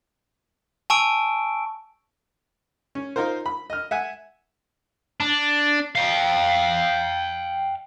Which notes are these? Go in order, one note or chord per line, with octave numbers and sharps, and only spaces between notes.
G#5 A5 C#6 E6 D7
C#4
D#4 F4 A#4 C5
B5
D#5 F6
E5 F#5 G#5
D4
F5 G5